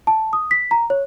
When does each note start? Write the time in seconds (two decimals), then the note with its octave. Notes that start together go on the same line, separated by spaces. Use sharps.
0.07 A5
0.33 D#6
0.51 B6
0.71 A#5
0.90 C#5